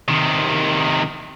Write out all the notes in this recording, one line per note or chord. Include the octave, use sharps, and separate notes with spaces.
C3 D#3